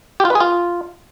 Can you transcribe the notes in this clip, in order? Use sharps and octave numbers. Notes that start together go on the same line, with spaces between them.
G4
F4
B4
G#4
F4